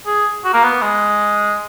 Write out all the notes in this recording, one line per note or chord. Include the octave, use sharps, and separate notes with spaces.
G#4
F#4
A#3
B3
G#3